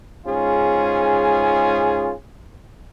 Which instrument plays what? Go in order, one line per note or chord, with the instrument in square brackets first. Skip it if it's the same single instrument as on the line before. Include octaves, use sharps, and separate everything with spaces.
[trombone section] G#2 C#4 F4 G#4